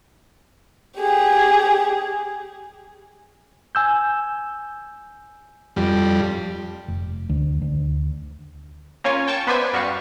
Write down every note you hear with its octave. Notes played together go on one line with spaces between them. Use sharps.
G4 G#4
G#5 E6 G6
F2 G3
F1
D2
D2
A#3 C#4 F4 C#5 G#5
G5 A5 C#6
B3 B4 C5 D5 E5 G#5
F#2 G3 F#4 F5 C#6